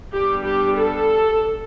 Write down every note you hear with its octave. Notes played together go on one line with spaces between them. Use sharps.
G3 B3 D4 G4
G4
A4